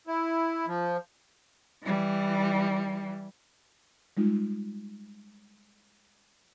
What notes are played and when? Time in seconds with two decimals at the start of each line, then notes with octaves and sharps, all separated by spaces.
0.07 E4
0.67 F3
1.83 E3 G3
4.17 G3 G#3 D#4 F4